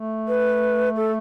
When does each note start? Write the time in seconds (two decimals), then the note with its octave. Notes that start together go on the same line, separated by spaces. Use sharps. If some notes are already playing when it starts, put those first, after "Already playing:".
Already playing: A3
0.28 B4
0.96 A4